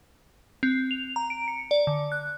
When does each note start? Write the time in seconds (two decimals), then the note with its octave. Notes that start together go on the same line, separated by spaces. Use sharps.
0.63 C4
0.91 F7
1.16 A#5
1.30 D7
1.48 C#7
1.71 D5
1.87 D3
2.12 F#6